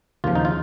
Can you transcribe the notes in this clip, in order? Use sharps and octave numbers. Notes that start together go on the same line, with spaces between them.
D#2 C#3 F3 F4
D#4
F4